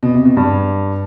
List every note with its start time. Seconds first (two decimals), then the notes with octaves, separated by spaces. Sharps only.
0.03 B2
0.14 C3
0.25 B2
0.37 G2